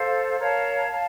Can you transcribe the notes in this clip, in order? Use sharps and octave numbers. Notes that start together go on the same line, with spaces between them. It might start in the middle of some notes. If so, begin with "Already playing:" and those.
Already playing: A4 C5 F5
A#4 C#5 F5 A5
F5 A5